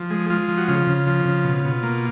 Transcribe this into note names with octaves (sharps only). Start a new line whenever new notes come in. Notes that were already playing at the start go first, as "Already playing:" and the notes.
Already playing: F3
G#3
G#3 F4
F3
F#4
C#3 F4
C#3
F3
C#3
B2
B2
A#3